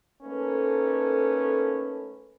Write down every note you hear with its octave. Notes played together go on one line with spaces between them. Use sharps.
A3 A#3 C#4 D#4 A4 B4